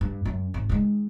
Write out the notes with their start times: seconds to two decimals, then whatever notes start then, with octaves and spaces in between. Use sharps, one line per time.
0.01 G2
0.25 F#2
0.54 G#1
0.69 D#3 G#3